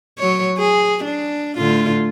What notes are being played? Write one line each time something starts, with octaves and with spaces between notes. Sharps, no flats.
F#3 C#5
G#4
D4
A2 D3 F4